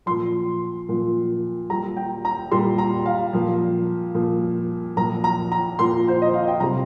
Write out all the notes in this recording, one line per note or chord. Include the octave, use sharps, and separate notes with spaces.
A#2 F3 C6
A#2 F3
A#2 G3 A#5
G5
A#5
A#2 G3 C6
A#5
F5
A#2 F3
A#2 F3
A#2 F3 A#5
A#5
A#5
A#2 F3 C6
C5
D#5
F5
G5
C3 G3 A#5